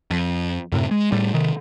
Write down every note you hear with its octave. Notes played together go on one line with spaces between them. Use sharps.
F2
F#2 A2 C3
G#3
A2 G3
C3 D#3